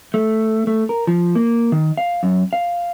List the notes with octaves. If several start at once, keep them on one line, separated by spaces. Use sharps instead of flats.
A3
A3
A#4
F3
A#3
D#3
F5
F#2
F5